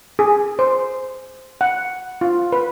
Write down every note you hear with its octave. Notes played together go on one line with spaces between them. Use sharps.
G#4
C5
F#5
F4
B4